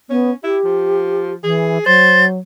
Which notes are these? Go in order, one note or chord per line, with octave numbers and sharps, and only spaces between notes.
B3 C#4
E4 G4
F3
E3 G#4
F#3 C5 A6